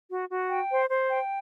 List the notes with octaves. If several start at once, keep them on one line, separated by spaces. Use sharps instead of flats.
F#4
F#4
G5
C5
C5
G5